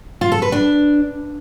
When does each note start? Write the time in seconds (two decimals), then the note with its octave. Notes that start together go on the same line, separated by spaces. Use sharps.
0.21 F4
0.32 A4
0.42 B4
0.52 D4